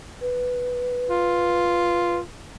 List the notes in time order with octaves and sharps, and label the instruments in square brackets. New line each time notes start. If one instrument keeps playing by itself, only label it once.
[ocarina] B4
[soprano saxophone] F4